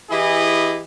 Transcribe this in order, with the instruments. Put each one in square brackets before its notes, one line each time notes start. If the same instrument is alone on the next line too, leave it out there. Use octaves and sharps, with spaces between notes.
[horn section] E3 E4 G4 G#4 D#5